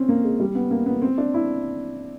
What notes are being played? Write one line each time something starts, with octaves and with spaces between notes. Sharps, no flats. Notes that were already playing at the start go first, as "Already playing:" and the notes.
Already playing: C4 C#4
A#3
G#3
G3
B3
A#3
B3
C4
D4
E4